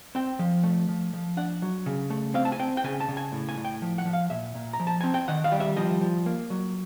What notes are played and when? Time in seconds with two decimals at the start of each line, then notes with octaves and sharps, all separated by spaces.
0.15 C4 G5
0.39 F3
0.63 A3
0.88 F3
1.13 F3
1.37 D4 F#5
1.62 F#3
1.86 C#3
2.10 A3
2.34 C4 F5
2.45 A5
2.52 G#5
2.59 C4 G5
2.77 G5
2.84 C#3 G#5
3.00 A5
3.08 C#3
3.17 G#5
3.32 A2
3.49 G#5
3.58 A2
3.65 G5
3.82 F3
3.98 F#5
4.05 F3
4.13 F5
4.30 A#2 E5
4.55 A#2
4.73 A#5
4.80 F3
4.87 A5
5.01 C4 G#5
5.14 G5
5.28 D#3 F#5
5.44 F5
5.52 G3
5.60 E5
5.77 F3 D#5
6.01 F3
6.26 A#3
6.50 F#3